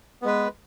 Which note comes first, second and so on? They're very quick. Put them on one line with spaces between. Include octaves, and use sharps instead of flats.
B3 G#3 B4